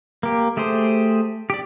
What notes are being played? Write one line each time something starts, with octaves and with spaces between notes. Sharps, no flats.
A#3 G4
A3 G4 G#4 C5
G4 D5